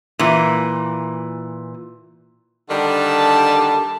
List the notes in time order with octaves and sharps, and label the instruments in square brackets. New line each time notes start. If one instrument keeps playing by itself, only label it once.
[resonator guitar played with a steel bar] A#2 E3
[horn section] D3 D#3 G3 A5